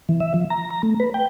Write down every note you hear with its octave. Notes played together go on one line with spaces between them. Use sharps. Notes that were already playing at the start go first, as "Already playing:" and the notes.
E3
E5
F3
A#5
A#5
A3
B4
G5